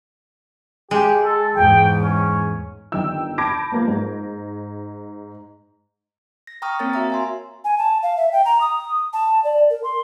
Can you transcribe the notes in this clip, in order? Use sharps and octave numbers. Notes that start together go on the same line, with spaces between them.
G#3 G4
A4
E2 G#2 G5
C#4
G1 D#3 G5 E6
A5 B5 D6 G6 G#6 A#6
F3 A#3 B3
G#2
A#6
G5 A#5 C#6 D#6 F6
A#3 C4 A#4 C#5 A6
F#4 E5 F5 A#5
E5 G#5 C6
G#5
A5
F5
E5
G5
A#5
D#6
A5
D5
A#4
C6